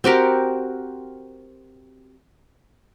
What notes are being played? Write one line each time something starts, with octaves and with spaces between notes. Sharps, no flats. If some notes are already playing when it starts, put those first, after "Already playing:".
C4 F#4 G4 A#4